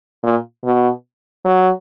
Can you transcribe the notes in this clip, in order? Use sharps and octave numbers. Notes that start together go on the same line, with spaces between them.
A#2
B2
F#3